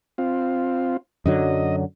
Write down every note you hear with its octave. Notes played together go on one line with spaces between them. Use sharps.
C4 F4
F#2 D3 F#3 D#5